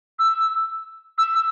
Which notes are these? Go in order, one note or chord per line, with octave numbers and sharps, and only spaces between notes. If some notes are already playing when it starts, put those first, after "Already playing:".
E6
E6
E6